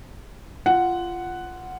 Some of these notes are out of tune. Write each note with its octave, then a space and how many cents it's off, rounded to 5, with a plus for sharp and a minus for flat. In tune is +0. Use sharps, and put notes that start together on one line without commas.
F4 -15 F#5 +0